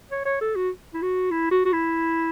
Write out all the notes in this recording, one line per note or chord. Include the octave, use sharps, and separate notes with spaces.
C#5
C#5
A4
F#4
E4
F#4
E4
F#4
F#4
E4